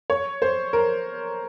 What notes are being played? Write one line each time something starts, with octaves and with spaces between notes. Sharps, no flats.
C#5
C5
A#4